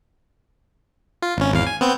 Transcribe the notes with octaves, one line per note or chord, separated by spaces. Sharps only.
F4
G#1 C#4
G#1 E2 F5
G#5
B3 C4 G6